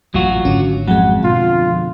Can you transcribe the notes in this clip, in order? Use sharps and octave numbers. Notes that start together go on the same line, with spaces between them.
A1 F#2 A#2 F#3 F4 F#4
G#1 D3 C#4
F2 F#3 G#3 F#5
B2 D3 F4